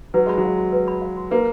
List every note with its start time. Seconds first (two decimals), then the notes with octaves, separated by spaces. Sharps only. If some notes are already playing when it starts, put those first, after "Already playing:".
0.14 F#3 B4
0.26 G#3 B5
0.38 F#3
0.44 F5
0.58 F#4
0.72 B4
0.88 B5
1.02 F5
1.17 F#4
1.31 A#3 B4